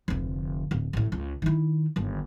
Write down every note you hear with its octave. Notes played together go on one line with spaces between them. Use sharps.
F1 D2
D1
A1 A2
C#2
D#3 E4
G1 D#2